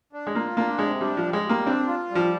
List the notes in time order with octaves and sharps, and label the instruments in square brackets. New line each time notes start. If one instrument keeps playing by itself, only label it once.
[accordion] D4
[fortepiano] G#3
[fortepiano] A#3 [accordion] F4
[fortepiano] A#3 [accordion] D4
[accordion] C3 [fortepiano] G#3
[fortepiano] G3 [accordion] D4
[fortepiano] F3
[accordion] G3
[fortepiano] G#3
[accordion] G3
[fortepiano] A#3
[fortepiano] C4 [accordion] D4
[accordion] F4
G3
[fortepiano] F3